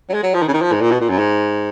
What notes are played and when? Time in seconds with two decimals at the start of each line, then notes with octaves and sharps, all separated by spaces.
0.09 F#3
0.14 G#3
0.23 F#3
0.34 F3
0.42 D#3
0.48 C#3
0.53 D#3
0.61 F3
0.72 G#2
0.82 A#2
0.91 B2
1.01 A#2
1.10 F#2
1.19 G#2